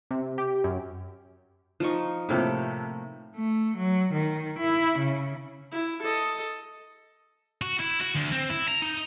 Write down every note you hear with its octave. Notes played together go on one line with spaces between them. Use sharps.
C3
G4
F#2
F3 D#4 C#6
A2 C3 F3 A3 A#3
A3
F#3
D#3
E4
C#3
E4
A4 D#5
F#4
E4
F#4
D2
C4
E4
A#5
D#4